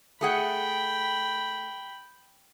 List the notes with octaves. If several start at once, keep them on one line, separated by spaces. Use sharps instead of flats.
A3 G#4 F#5 G5 B5